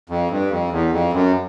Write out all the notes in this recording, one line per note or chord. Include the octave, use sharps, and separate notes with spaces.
F2
G2
F2
E2
F2
F#2